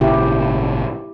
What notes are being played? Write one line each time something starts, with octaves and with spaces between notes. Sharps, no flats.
G#1 A#2 C#3 E4 G4